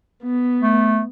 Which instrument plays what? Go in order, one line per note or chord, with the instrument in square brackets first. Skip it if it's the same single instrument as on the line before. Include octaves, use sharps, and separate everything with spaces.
[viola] B3
[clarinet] A3